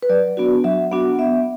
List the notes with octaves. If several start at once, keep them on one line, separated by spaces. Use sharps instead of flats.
B4
F#3 D5
B3 D4 F#4
F#3 E5
B3 D4 F#4 F#5
B3 E5